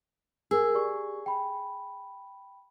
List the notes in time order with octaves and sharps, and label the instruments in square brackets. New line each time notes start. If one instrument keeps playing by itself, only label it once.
[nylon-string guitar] G#4 [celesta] A#4 E6
[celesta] G4 D5 C#6
G5 B5